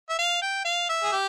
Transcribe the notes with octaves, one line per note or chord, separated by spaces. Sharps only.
E5
F5
G5
F5
E5
G#4
G4